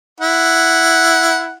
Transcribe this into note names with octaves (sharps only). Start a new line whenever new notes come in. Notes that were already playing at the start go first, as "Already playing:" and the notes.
E4 F#5